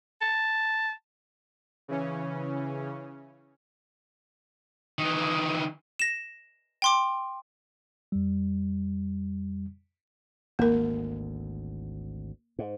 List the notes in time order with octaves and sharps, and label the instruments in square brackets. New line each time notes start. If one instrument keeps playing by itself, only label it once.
[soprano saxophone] A5
[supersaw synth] C#3 E3 C#4
[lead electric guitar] D#3 E3
[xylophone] A#6 E7
G5 C6 D6
[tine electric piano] F2 G3
[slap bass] G#1 D2 [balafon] A#3 A#4
[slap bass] G#2